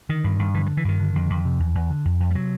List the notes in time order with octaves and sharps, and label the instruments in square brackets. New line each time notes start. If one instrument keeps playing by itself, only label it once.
[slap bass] D3 D#3
G2
G2
D3 E3
E3
G2
E3
G2 D#3
D3
F2
F2
C3
E2
E2
D3
F2
F2
G3
C3 F#3